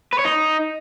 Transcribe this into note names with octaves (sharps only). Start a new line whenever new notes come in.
B4
C#5
D#4